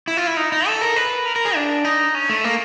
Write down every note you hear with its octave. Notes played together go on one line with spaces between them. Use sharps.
E4
F4
E4
D#4
D#4
A4
A#4
B4
A#4
A#4
G#4
D4
D#4
C#4
A3
A#3